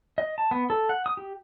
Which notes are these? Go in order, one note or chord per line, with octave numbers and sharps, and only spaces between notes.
D#5
A5
B3
A4
F#5
D#6
G4